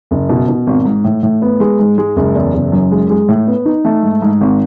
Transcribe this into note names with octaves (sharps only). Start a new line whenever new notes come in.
F#1
B2
B2
G#1
G#2
A2
A2
B3
G#3
G#2
G#3
F#1
E2
F#1
F#2
G#3
G#3
A2
B3
D#4
A3
G#2
G#2
G#1